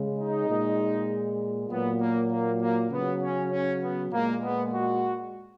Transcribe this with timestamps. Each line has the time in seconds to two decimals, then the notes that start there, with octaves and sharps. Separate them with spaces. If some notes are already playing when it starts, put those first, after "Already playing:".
Already playing: C#3 G#3
0.19 D#4
0.48 A#2 G#3
1.69 A#2 F#3 B3
2.00 A#3
2.30 A#3
2.59 A#3
2.90 C#3 F#3 B3
3.21 C#4
3.50 C#4
3.81 B3
4.11 A#2 G#3 A#3
4.41 B3
4.72 F#4